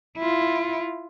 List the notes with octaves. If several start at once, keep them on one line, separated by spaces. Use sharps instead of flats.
E4 F4